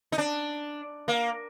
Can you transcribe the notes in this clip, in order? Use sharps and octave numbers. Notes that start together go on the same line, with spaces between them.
D#4
D4
A#3